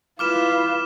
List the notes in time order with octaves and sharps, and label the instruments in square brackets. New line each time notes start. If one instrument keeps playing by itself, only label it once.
[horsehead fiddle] E4 B4 [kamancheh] F4 [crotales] D6 F6 E7